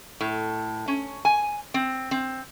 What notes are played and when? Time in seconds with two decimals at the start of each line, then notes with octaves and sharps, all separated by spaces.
0.21 A2
0.88 C#4
1.25 G#5
1.74 C4
2.11 C4